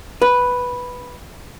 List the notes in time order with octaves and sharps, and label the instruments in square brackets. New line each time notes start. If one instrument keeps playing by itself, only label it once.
[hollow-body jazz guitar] B4